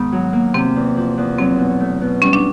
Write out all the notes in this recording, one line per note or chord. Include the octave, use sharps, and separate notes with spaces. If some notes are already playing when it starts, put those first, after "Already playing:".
Already playing: G#2 D#3 B3
F#3
A#3
C3 C4
E2
F3
E2
F#3 C4
B2
A3
B2
G3 C#4
D4